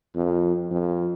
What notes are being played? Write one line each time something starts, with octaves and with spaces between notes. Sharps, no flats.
F2
F2